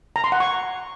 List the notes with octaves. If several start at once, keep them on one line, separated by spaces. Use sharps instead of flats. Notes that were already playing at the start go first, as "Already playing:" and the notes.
A#5
C6
F#5
C#6